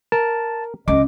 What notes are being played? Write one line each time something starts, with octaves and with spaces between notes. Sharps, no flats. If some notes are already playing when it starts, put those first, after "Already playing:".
A#4 A5
C#2 D#5 D6